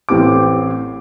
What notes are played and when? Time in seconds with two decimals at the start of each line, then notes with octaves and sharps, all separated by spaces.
0.09 A1 A2 C4 G4 D6